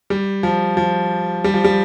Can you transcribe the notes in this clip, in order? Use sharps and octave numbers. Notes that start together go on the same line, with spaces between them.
G3
F3
F3
G3
F3
G3